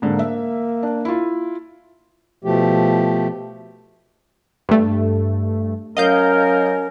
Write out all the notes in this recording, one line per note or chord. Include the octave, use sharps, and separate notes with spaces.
G#2 D3 A#3
E5
D4
E4 F4
B2 F3 A3 G4
G2 A3
F#3 C#4 A#4 D#5 F5 G6